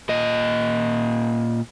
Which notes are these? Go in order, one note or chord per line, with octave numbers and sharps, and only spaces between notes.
A#2 D#5